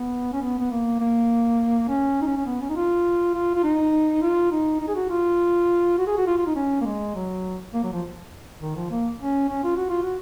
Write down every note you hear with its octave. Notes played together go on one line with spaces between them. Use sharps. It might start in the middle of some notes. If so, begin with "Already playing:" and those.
Already playing: B3
C#4
B3
B3
A#3
A#3
C#4
D#4
C#4
C#4
B3
C#4
D#4
F4
F4
F4
D#4
F4
D#4
D#4
G#4
F#4
F4
F#4
G#4
F#4
F4
F4
D#4
C#4
A#3
G#3
F#3
A#3
F#3
F3
D#3
F3
A#3
C#4
C#4
F4
F#4
F4
F#4